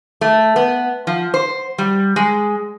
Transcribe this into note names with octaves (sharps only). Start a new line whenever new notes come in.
A3
B3
F3
C5
G3
G#3